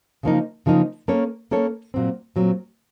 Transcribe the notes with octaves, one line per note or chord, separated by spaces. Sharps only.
C#3 F3 A#3 D#4
C#3 F3 A#3 D#4
A#3 C#4 A4 C#5
A#3 C#4 A4 C#5
A#2 F#3 C4
A#2 F#3 C4